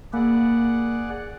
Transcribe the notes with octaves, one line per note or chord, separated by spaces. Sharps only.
A#3 G#4 D5 F#5